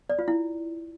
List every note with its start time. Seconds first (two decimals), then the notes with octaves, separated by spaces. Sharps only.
0.10 D5
0.19 F4
0.28 E4